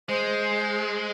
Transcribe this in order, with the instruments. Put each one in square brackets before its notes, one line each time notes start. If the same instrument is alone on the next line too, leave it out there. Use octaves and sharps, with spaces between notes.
[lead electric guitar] G#3 [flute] C5